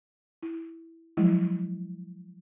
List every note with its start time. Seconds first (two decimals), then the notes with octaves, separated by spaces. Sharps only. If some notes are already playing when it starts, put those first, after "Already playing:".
0.43 E4
1.17 F3 F#3 G#3 E4